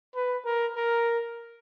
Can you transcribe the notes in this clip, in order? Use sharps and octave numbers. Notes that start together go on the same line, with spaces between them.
B4
A#4
A#4